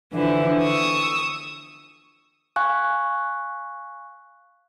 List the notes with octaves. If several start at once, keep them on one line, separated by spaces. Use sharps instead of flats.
D3 E3 F3 E4
C#6 D#6 E6
F5 G#5 C#6 F#6